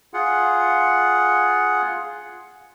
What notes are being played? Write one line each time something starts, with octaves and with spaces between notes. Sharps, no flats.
F4 G#4 F#5